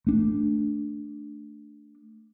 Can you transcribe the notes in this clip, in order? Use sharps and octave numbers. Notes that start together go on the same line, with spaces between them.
A3 D4